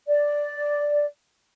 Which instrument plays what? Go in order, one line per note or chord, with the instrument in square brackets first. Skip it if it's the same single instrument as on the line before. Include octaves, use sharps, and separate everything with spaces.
[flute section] D5